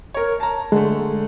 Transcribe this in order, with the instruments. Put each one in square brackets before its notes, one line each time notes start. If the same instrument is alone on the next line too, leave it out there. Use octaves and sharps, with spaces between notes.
[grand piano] A#4 C#5
A5 A#5
[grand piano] D3 A3 [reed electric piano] G#3